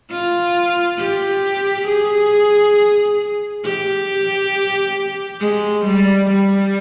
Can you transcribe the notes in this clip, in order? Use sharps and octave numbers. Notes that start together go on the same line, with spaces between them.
F4
G4
G#4
G4
G#3
G3
G3